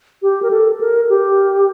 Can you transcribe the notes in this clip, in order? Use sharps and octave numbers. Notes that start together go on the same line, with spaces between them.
G4
A#4
A4
A#4
G4